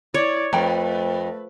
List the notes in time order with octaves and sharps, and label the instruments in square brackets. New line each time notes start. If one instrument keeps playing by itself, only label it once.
[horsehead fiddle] E4 D5 [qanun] C#5
[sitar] F2 [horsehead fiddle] A3 B4 [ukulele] A#4 G5 A#5